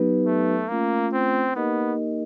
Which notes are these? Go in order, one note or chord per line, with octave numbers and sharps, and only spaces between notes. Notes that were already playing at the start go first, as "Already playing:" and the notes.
Already playing: F#3 B3 D#4 G4 B4
A3
A3 A#3 C#4 F4
C4
A#3 B3 D#4 G4 A#4 D#5